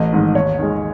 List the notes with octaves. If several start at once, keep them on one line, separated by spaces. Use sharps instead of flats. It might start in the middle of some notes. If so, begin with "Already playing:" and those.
Already playing: A1 D#5
G#2 D#3
D#2 C#5
D#3 G#3